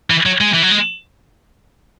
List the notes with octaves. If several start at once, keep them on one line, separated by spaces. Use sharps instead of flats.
E3
F#3
G#3
E3
F#3
G#3